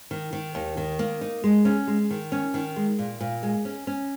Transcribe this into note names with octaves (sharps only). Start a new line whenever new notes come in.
D#3
D#3
D#2
D#3
A#3
D#4
G#3
C#4
G#3
D#3
C#4
D#3
G#3
A#2
A#2
G#3
C#4
C#4